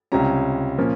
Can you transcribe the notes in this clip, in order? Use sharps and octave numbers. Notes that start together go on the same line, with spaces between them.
C#2 C3 G3 C#4 A#5
A#2 F3 A#3 C#4